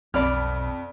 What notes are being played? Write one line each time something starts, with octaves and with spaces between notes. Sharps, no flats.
B1 F2 D5 B5 F6